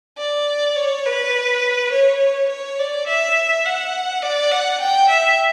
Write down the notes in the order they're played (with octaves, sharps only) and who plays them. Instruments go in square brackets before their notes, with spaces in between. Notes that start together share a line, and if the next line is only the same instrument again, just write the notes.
[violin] D5
C#5
B4
C#5
C#5
D5
E5
F#5
D5
F#5
G5
E5